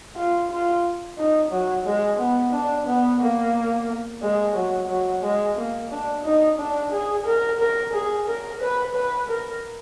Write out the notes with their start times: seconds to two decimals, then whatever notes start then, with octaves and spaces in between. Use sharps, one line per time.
0.16 F4
0.51 F4
1.18 D#4
1.51 F#3
1.86 G#3
2.19 B3
2.53 D4
2.87 B3
3.20 A#3
4.22 G#3
4.56 F#3
4.89 F#3
5.23 G#3
5.57 A#3
5.90 D4
6.24 D#4
6.58 D4
6.92 G#4
7.26 A#4
7.60 A#4
7.93 G#4
8.27 A#4
8.61 B4
8.94 B4
9.29 A#4